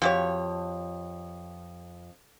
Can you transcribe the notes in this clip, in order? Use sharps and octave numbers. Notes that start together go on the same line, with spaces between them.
F2 F#4 G4 C#5